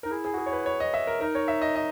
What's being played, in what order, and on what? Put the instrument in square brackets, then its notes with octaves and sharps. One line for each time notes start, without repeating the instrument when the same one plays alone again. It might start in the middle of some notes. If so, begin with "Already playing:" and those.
[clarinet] D#4 [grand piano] A#4
[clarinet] E4 [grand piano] G#4
[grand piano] G#4
F#4
G#4
C#5
B4
C#5
D#5
E5
A#4
[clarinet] D#4 [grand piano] A#4
[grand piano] C#5
E5
D#5
D#5